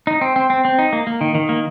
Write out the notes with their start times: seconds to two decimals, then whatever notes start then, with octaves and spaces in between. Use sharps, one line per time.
0.07 D#4
0.21 C4
0.36 C4
0.50 C4
0.65 C4
0.79 D#4
0.93 A#3
1.07 A#3
1.21 D#3
1.35 D#3
1.49 A#3